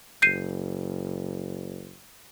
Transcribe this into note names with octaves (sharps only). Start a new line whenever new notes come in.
F#1 G6 C7 D#7